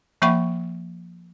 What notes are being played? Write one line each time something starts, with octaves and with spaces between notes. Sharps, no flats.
F3 A#3 E5 G5 B5 C#6